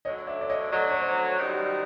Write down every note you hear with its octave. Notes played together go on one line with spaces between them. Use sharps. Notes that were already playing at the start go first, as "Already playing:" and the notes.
D2 D3 F#3 C#5 D#5
D5 E5
D5
C#5 D#5
D2 D3 F#3 D#5
D5
C#5
C5 D5
F#2 D#3 G3